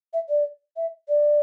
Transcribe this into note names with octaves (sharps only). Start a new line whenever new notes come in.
E5
D5
E5
D5